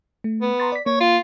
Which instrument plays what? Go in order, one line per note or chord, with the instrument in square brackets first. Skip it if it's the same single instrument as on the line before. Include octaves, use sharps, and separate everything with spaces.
[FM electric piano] A3
[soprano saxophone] B3
[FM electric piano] A#5 C6 A6
D5 B6
[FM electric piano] A#3 [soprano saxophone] C#5
[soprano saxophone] F4